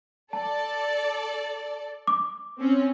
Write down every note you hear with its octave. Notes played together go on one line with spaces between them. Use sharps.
A4 D5 A5
D6
C4 C#4